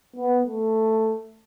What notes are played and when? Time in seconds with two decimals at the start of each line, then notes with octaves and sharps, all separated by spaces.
0.16 B3
0.46 A3